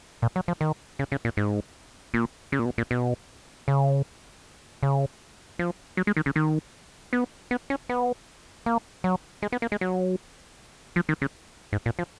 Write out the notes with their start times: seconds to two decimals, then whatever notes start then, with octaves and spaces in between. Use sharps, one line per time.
0.22 A#2
0.36 F#3
0.48 F3
0.61 D#3
0.99 C#3
1.12 C#3
1.25 A#2
1.37 G#2
2.14 A#2
2.52 C#3
2.59 A#2
2.65 B2
2.78 A#2
2.91 B2
3.68 C#3
4.83 C#3
5.59 F3
5.97 F#3
6.07 G#3
6.17 D#3
6.26 C#3
6.36 D#3
7.13 B3
7.51 B3
7.70 C#4
7.89 B3
8.66 A#3
9.04 F#3
9.42 G#3
9.52 B3
9.62 A#3
9.72 G#3
9.81 F#3
10.96 F3
11.09 D#3
11.22 C#3
11.73 G#2
11.86 A#2
11.99 F3